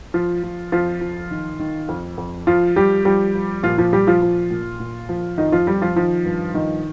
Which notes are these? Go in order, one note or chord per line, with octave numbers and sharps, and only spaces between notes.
F3 F4
F3
F2 F3 F4
F3
D#3
D#3
F2
F2
F3 F4
F3 G3 G4
F3 G3 G4
F3
A#2 F3 F4
F3 F4
A#2 G3 G4
F3 F4
F3
A#2
A#2
F3
F2 D#3 D#4
F3 F4
F2 G3 G4
F3 F4
D#3 F3 F4
G2
D#3 F3 D#4